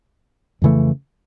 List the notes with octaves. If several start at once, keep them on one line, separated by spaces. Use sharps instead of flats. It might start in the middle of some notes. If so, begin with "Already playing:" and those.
F2 C#3 E3 A3